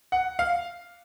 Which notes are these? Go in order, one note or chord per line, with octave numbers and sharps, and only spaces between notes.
F#5
F5